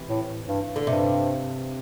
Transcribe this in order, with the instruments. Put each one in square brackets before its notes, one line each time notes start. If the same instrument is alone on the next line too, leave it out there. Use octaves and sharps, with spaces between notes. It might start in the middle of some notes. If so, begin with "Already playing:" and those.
Already playing: [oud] C3 E3
[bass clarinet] A2
G2
[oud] D3
[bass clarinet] G2 [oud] C3